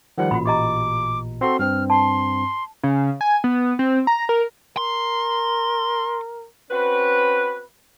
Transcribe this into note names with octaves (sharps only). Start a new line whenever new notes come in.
D#3 F3 G3 F#5
A1 A#2 F#4 B5
G4 D#5 A#5 D6
C4 F#4 A4 C6
G2 C4 F6
A5 C6
C#3
G#5
B3
C4
A#5
A#4
A#4 C6
C4 C#4 F#4 B4